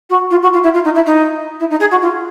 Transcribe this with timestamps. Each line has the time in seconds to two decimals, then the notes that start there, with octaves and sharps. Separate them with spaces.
0.10 F#4
0.31 F4
0.42 F#4
0.53 F4
0.63 E4
0.74 F4
0.84 D#4
0.95 E4
1.06 D#4
1.60 E4
1.70 D#4
1.80 G#4
1.91 F#4
2.02 F4